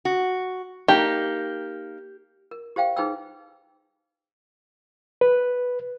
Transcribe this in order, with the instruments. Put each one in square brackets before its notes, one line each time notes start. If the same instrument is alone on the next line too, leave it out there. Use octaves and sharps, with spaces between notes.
[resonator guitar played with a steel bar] F#4
[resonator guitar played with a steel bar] A#3 D#4 [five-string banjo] G4
[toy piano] A#4
G4 C5 F5 G5
D#4 G#4 B4 C5 G5 E6
[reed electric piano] B4